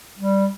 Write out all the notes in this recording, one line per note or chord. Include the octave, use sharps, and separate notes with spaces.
G3